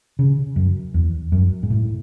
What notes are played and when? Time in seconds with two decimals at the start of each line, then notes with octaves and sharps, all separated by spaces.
0.19 C#3
0.56 F#2
0.94 E2
1.32 F#2
1.63 G#2
1.70 A2